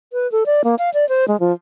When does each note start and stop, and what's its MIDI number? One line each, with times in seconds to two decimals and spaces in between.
0.13 0.30 71
0.32 0.44 69
0.46 0.62 74
0.64 0.75 58
0.79 0.90 77
0.94 1.08 74
1.09 1.25 72
1.28 1.39 56
1.40 1.53 53